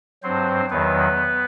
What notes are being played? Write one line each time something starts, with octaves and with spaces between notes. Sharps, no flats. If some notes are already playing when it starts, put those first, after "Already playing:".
G2 F#3 C4 C5
E2 D#3 F#3 B3 B4